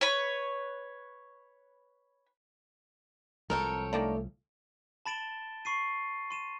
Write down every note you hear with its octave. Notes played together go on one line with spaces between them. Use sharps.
B4 C#5
C2 F3 G#3 A4 A#4 C#5 G5
D#3 A3 A#3 D4
A5 B5 A6 D7 E7 G7
B5 C#6 C7 D#7
C6 D#7 E7